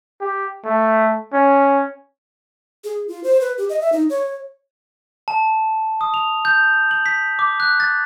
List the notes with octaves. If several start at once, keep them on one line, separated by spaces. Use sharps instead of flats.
G4
A3
C#4
G#4
F4
C5
B4
G4
D#5
E5
D#4
C#5
A5
D#6
F7
G6
F#7
B6
D6
F#6
A6